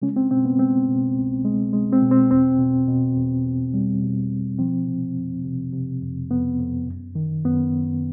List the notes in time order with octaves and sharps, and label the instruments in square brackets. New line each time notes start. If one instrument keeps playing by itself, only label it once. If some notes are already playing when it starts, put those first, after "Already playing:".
[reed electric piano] C#3 G#3 C#4
C4
B2 C4
B3
G#3 C4
B2
C2
G#3
G#3
C4
B2
C4
E2 C4
B2
B2
E2
E2
G3
B2
B2
F3 C4
C3
F2
C3
C3
F2
F2 B3
F2
F#2
D#3
F#2 B3
F#2